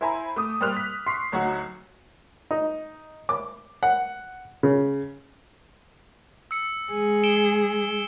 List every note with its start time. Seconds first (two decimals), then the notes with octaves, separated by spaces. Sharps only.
0.01 E4 C5 E5 G#5 A#5 B5
0.36 A3 D6 D#6
0.61 G3 A#3 C5 F6 F#6 F7
0.77 B6
1.06 C6 C#6 B6 C7
1.32 D2 F#3 D#4 F#4
2.51 D#4
3.29 D6
3.83 F#5
4.63 C#3
6.51 E6 C#7
6.91 G#3 G#4
7.24 D7 E7 G7